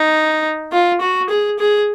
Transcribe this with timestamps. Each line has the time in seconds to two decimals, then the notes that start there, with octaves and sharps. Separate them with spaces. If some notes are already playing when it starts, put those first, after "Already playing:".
Already playing: D#4
0.72 F4
1.01 F#4
1.30 G#4
1.59 G#4